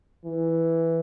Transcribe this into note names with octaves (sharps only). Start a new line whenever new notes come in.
E3